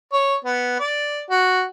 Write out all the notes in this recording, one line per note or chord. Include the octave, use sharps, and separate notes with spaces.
C#5
B3
D5
F#4